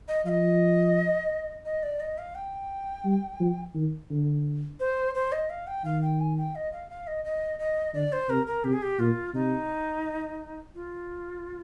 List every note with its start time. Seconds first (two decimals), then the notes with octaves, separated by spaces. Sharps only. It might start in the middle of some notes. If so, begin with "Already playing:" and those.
0.08 D#5
0.25 F3 F5
0.29 D#5
1.65 D#5
1.83 D5
2.00 D#5
2.18 F5
2.35 G5
3.05 G3
3.40 F3
3.75 D#3
4.10 D3
4.80 C5
5.15 C5
5.32 D#5
5.50 F5
5.67 G5
5.85 D#3 F5
6.02 G5
6.20 G#5
6.38 G5
6.55 D#5
6.73 F5
6.90 F5
7.07 D#5
7.25 D#5
7.59 D#5
7.94 D3 D5
8.13 C5
8.29 C3 A#4
8.47 A#4
8.64 C3 G4
8.73 G#4
8.82 G4
8.99 A#2 F4
9.34 C3 D#4
10.75 F4